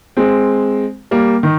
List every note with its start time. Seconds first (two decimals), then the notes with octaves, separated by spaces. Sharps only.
0.17 G#3 C4
1.11 G3 A#3
1.43 D#3